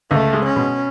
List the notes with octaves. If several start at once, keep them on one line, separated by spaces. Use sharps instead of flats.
C#2 A3
G#3
C#4
B2